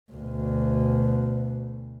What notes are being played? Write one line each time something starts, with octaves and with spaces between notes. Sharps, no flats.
D2 B2